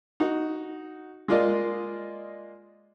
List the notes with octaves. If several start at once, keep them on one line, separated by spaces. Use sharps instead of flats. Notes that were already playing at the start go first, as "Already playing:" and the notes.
D#4 F#4
G#3 A#3 F4 D5 D#5 F5